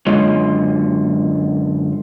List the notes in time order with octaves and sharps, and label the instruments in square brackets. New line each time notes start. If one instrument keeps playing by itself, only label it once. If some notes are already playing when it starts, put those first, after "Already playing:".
[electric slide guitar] F#2 D3 G#3 F4 C#5 D#5